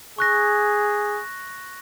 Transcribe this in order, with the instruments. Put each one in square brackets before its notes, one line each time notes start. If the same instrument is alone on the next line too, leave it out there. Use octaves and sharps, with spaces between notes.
[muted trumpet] G#4 [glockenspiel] C#6 F#6 A#6